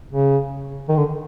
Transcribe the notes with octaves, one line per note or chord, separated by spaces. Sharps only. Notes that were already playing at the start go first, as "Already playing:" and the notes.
C#3
D#3
D3